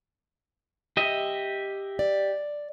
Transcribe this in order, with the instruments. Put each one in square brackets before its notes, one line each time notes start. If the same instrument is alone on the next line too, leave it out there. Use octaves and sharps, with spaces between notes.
[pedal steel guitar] G4 D#5 E5
[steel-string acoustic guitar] D5